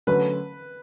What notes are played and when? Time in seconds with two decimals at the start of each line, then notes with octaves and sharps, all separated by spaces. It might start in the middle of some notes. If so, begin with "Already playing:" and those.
0.07 D3 F#3 A3 C#4 B4